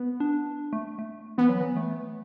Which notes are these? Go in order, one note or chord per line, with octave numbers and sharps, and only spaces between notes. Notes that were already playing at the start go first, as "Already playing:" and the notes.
Already playing: B3
D4
A3
A3
E3 B3
F#3
E3
A3